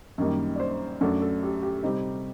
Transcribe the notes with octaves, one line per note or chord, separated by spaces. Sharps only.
F#2 D#3 G3 A#3 D#4
D5
C5
F#2 F#3 A3 D4 A4
A4
G4
G4
C3 G3 C4 D#4